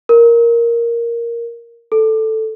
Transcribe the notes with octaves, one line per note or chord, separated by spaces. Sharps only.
A#4
A4